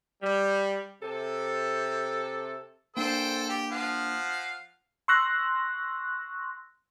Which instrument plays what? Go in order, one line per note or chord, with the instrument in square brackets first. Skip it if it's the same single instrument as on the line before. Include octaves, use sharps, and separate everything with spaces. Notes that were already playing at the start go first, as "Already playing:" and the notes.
[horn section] G3
C3 A4
[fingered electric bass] A#3 D4 [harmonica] A4 C5 G5
[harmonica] G4
F3 F5 F#5
[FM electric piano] C6 C#6 E6 F#6 A#6